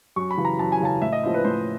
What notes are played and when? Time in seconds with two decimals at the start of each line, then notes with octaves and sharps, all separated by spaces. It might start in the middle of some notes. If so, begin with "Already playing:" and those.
0.16 F#2 C#6
0.31 B5
0.37 C#3 E3
0.45 A#5
0.59 F#2 A5
0.72 G#5
0.80 C#3 E3 A5
1.02 A2 E5
1.12 D#5
1.23 F3 A#3 C#4 E4 C5
1.34 B4
1.45 A2 C5